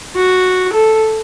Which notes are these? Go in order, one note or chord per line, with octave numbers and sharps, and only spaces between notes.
F#4
A4